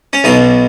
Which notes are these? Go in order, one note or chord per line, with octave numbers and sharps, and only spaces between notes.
C#4
B1 B2 D#4